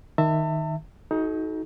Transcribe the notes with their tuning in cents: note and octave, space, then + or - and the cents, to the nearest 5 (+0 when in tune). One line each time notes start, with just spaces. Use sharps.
D#3 +0 E5 +0 A5 +40
D#4 +20 F#4 +0 A4 -40